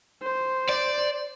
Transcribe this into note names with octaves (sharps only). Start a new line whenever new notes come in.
C5
D5